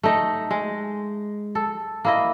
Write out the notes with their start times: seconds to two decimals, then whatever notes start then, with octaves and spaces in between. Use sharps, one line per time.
0.03 A3 D#4
0.51 G#3
1.55 A4
2.05 A#3 E4 D#5